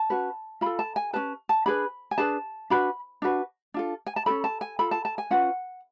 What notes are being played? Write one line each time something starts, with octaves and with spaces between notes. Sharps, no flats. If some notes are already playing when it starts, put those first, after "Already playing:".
Already playing: A5
C#4 F#4 B4
F4 A4 B5
A5
G#5
C#4 G#4 B4 A5
A5
D4 G#4 B4 B5
G#5
D4 G#4 B4 A5
D4 F#4 B4 B5
D4 F#4 B4
D4 F4 A4
G#5
A5
C#4 F#4 A4 B5
A5
G#5
F4 A4 B5
A5
A5
G#5
C#4 F4 B4 F#5